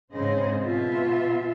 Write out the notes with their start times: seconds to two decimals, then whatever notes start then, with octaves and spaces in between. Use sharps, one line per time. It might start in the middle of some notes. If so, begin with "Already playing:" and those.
0.13 G#2 C#3 C4 G#4 C5 D#5
0.60 B2 F4 E5